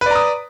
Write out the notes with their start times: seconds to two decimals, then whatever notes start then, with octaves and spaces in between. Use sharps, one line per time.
0.01 B4
0.06 D5
0.11 A#5
0.15 D#6